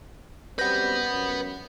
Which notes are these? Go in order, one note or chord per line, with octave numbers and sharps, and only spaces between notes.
F#2 G3 C4 B4 F#5 G6 A#6
F#2